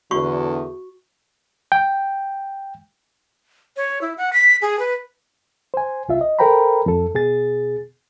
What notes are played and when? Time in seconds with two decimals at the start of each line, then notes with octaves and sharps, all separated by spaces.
0.11 E2 D3 F#4 C#6
1.72 G5
3.77 C#5
4.01 E4
4.18 F#5
4.33 B6
4.62 G#4
4.79 B4
5.74 C5 G#5
6.09 C2 F4 E5
6.21 D#5
6.39 A4 A#4 C5 G5 A#5 B5
6.86 F2 A4
7.15 B2 G#4 A6